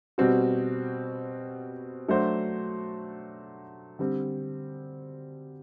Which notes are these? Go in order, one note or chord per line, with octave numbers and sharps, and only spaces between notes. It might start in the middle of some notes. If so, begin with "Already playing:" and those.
B2 G3 C4 F#4
F#3 A3 D4 F#4 C5
D3 G3 C4